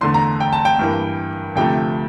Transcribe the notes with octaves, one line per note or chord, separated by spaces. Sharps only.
E2 D3 A3 C6
A#5
G5
A5
G5
G2 E3 A#3
D2 C3 F3 A3 G5